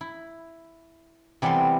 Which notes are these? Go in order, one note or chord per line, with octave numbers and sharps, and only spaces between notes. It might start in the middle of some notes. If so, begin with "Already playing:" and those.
E4
C3 E3 G3 B3 A4 C6